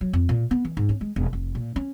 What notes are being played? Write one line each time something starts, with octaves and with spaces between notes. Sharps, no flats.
F#3
F2
A#2
B3
E3
G#2
C#4
G#3
E1
F1
A#2
C#4